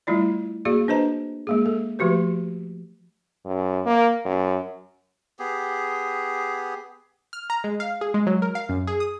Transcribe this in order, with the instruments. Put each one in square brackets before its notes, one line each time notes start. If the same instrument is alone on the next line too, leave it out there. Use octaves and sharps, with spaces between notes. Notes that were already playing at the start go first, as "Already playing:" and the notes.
[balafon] G3 A3 E4 F4 D5
A#3 F#4 G#4 D5
D4 B4 C5 D#5 A#5
G#3 A#3 G#4
A4
F3 A3 F#4 G4 B4
[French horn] F#2
A#3
F#2
[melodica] B3 G4 G#4
[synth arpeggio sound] F6
A#5
G#3
F5
G#4
G#3
F#3
A#4
F5
F#2
G#4
D#6